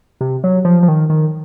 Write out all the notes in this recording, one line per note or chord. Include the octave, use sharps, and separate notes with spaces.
C3
F#3
F3
F3
D#3
D#3